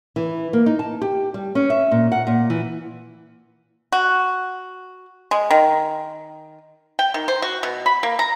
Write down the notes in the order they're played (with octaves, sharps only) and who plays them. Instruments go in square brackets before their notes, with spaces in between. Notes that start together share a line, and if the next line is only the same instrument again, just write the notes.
[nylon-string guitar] E3
A#3
D#4
A5
G4
G3
C#4
E5
A#2
F#5
A#2
E3
[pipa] F#4
G#3
D#3
G5
D#3
C5
F#4
B2
B5
A#3
A#5